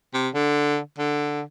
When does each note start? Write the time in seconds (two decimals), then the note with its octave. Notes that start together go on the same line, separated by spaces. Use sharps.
0.14 C3
0.35 D3
0.98 D3